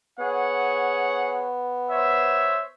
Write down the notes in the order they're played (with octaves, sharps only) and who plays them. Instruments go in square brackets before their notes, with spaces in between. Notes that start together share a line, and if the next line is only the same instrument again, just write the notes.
[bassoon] B3 [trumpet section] G#4 C#5 F#5
[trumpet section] C5 C#5 E5